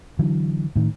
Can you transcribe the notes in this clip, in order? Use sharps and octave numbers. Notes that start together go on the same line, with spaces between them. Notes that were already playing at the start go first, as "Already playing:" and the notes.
D3 E3 F#3
A2 D#3